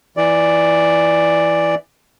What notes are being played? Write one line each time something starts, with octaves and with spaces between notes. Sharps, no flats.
E3 D5